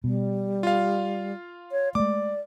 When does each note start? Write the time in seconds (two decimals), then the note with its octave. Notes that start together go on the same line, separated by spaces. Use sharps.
0.04 B2 G3
0.63 F4 F5
1.72 C#5
1.95 G#3 A3 D5 D6